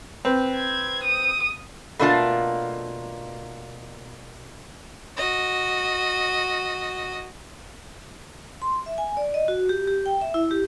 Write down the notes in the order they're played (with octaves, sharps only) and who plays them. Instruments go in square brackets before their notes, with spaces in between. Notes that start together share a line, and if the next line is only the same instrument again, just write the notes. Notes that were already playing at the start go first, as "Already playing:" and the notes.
[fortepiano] C4 B4
[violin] G#6
D#6
[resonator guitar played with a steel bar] B2 A3 A#3 D4 F4 A5
[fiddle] F#4 D#5
[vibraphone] C6
E5
G#5
D5
D#5
F#4
G4
G4
G5
E5
E4
G4